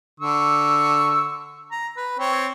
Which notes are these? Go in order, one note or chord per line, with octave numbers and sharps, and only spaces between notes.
D3 C#6 E6
A#5
B4
C4 C#5